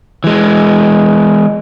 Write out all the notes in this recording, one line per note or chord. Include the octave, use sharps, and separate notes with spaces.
E3 G#3